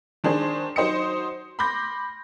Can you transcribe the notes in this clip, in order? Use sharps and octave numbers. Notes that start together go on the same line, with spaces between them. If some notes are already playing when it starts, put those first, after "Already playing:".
D#3 D4 G#4 C5
F#3 D#4 C5 D#5 D#6 C#7
B5 C6 D6 G6 A#6